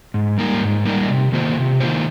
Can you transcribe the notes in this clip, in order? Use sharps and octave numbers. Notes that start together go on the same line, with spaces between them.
G#2
G3 A#3 D#4 A#4
G#2
G3 A#3 D#4 A#4
C3
D#3 A#3 F4 C5
C3
D#3 A#3 F4 C5